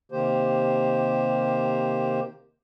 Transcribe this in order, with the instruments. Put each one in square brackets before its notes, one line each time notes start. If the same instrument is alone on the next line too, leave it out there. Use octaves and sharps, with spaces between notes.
[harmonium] C3 D#3 A#3 G4 C5